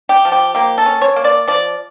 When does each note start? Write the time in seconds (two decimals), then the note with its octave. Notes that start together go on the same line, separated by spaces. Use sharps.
0.09 G4
0.25 F3
0.32 G4
0.55 A#3 G4
0.78 A4
0.86 C#4
1.02 C#5
1.16 A#3
1.24 D5
1.48 F3 D5